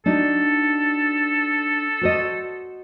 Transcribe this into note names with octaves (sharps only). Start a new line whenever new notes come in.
D4 D#4 F#4 A4
F#4 C5 D#5